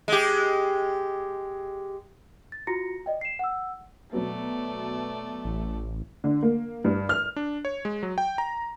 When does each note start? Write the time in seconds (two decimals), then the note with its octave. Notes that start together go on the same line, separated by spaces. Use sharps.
0.08 G#3 G4
2.52 A6
2.67 F4 F#4 A#5 A#6 C#7
3.06 D5 D#5 G5
3.21 C7 E7
3.39 F#5 E6
4.13 B2 F#3 A3 B3 D5
5.45 A1
6.24 D3
6.43 A#3
6.84 G2
7.09 F6
7.36 D4
7.65 C#5
7.85 G#3
8.03 F#3
8.18 G5
8.38 A#5